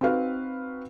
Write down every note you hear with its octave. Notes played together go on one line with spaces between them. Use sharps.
C4 D#4 F#4 B4 F5